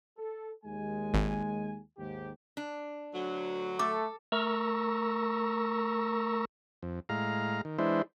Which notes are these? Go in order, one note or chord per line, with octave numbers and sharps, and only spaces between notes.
A4
D#2 G#3 G#5
G#1
D#2 G#2 G4
D4
D2 F#3
A3 A4 D6
A3 A#4 A#5 C#6 E6
F2
A2 G#3 F5 A#5
D#3
E3 G#3 D4 E4 C5